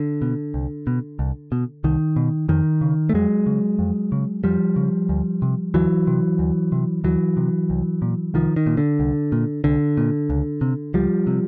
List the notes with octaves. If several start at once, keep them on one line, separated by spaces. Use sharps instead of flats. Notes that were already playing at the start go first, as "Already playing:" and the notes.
Already playing: D3
B2
C2
B2
C2
B2
C2 D#3
B2
F2 D#3
C#3
A3
F2 F#3 G#3
C#3
F2
C#3
F2 F3 G3
C#3
D2
C3
D2 E3 F#3
C3
D2
C3
D2 E3 F#3
C3
C2
A#2
C2 D#3 F3
D#3
A#2
D3
C2
A#2
C2 D3
A#2
C#2
C3
C#2 F3 G3
C3